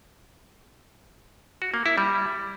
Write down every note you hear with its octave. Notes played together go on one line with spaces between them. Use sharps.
F#4
A#3
E4
G3